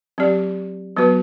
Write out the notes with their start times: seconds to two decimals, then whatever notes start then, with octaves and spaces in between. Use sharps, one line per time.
0.18 F#3 C4 G4 D5
0.96 F#3 B3 F#4 B4